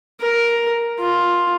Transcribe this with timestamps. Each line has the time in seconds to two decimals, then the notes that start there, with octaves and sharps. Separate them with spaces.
0.21 A#4
0.99 F4